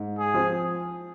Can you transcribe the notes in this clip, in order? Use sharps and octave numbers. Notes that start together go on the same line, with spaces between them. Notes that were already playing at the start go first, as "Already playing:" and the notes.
Already playing: G#2
G#4
F3 C4 F4